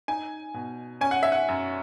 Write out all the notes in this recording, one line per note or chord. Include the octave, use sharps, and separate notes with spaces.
D#4 G#5
B2
C#4 G#5
F#5
E5
F#5
F#2